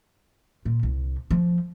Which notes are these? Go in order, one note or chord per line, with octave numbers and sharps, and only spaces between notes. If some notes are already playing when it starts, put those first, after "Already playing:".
A#2
C2
F3